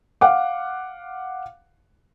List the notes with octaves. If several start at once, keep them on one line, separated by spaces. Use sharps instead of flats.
F5 F#5 D6